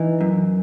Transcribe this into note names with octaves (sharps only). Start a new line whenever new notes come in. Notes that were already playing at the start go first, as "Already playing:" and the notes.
Already playing: E3 D#4
F#2